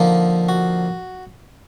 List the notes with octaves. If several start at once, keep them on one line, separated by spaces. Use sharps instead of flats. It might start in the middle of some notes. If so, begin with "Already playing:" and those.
Already playing: D3 F3 A#3 D#4
F#4